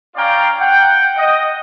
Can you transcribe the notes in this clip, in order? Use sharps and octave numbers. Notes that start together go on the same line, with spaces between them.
C#4 F4 D5 F5 G5 A#5
F#5 G5
D#5